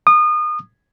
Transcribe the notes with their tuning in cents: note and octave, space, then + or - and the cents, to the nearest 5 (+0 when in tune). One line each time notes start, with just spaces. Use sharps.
D#6 -30